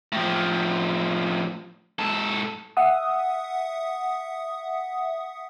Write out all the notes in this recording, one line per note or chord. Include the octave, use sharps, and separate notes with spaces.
A2 F3
G#2 A4
E5 F#5 D#6